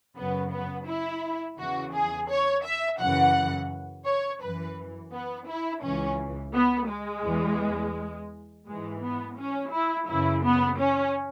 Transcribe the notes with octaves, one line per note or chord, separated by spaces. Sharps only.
F#2 C#3 F#3 B3
B3
E4
E2 C#3 E3 F#4
G#4
C#5
E5
F#2 C#3 E3 F#5
C#5
F#2 E3 B4
B3
E4
C#2 C#3 E3 C#4
B3
G#3
E2 E3
G#2 E3 G#3
B3
C#4
E4
F#2 C#3 E3 E4
B3
C#4